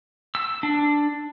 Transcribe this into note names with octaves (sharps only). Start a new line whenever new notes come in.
E6
D4